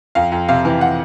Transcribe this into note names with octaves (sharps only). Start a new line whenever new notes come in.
F2 F5
F2
C3 F5
E3
F#5